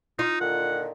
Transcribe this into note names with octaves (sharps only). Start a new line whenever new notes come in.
D#4 F4
A#2 D3 D#3 F#5